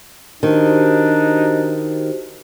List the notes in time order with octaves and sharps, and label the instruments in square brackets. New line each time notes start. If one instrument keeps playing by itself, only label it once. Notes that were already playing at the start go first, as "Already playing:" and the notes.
[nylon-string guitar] D#3 [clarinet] D4 [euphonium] D#4 [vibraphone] F#4 G4 C5